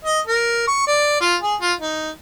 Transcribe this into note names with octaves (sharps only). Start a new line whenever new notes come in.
D#5
A#4
C#6
D5
F4
G#4
F4
D#4